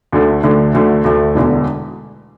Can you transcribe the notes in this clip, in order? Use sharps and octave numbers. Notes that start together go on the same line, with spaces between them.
D2 D3 A3
D2 D3 A3
D2 D3 A3
D2 D3 A3
E1 E2 D3